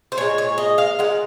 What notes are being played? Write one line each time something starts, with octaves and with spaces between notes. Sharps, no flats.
C5
A#2 G#3 C#5
C#5
D#5
F5
A#2 G#3 F#5